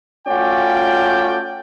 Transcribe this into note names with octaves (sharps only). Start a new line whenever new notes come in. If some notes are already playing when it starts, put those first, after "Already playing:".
A3 C#4 F4 F#4 D5 G5